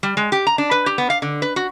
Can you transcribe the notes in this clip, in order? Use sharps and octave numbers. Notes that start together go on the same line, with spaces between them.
G3
G#3
G4
A#5
D4
B4
G4
B3
F5
D3
B4
F#4